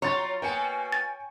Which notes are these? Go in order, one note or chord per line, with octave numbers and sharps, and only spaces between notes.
F#3 F4 C#5 A#5 C6 A6
B2 A#3 G5 G#5 C#7
A6